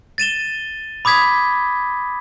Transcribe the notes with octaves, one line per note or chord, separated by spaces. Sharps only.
A6 D#7 E7 G7
B5 D6 D#6 G#6 B6